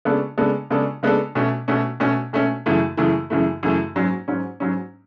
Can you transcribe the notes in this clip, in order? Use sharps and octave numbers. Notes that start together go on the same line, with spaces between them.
C#3 G#3 B3 D4 A4
C#3 G#3 B3 D4 A4
C#3 G#3 B3 D4 A4
C#3 G#3 B3 D4 A4
B2 A3 C#4
B2 A3 C#4
B2 A3 C#4
B2 A3 C#4
F#2 C#3 E3 A3
F#2 C#3 E3 A3
F#2 C#3 E3 A3
F#2 C#3 E3 A3
G#2 F#3 C#4
G#2 F#3 C#4
G#2 F#3 C#4